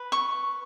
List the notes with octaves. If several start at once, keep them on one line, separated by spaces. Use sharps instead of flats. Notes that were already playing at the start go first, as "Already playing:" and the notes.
Already playing: B4
C#6